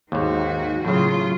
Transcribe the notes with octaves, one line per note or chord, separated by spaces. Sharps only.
D#2 G#2 D#3 F#4
A2 C#3 F#3 F4